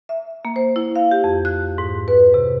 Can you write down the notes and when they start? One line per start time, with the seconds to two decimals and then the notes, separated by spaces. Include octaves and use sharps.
0.09 E5
0.45 A#3
0.56 C5
0.76 E4
0.96 F5
1.11 G4
1.24 F2
1.45 F#6
1.78 G#2
2.08 B4
2.34 C3